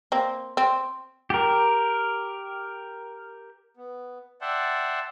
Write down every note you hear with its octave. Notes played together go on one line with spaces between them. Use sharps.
A#3 C4
C4
G4 A#4
B3
D5 E5 F#5 G5 A5 C6